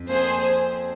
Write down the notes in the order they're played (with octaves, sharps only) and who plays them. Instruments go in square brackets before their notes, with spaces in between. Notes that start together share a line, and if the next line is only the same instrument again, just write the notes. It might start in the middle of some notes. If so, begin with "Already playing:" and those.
Already playing: [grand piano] F2
[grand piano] A#3 [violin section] G#4 C5